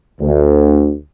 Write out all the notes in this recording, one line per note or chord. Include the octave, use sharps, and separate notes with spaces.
D2